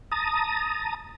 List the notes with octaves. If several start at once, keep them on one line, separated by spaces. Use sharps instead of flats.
A5 A#5 D#6